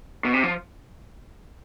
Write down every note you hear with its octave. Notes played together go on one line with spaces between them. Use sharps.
B2
C3
F3